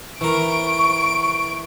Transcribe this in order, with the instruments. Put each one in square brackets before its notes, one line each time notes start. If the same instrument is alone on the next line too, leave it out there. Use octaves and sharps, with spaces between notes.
[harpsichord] E3 A#4 [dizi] C#6 [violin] D7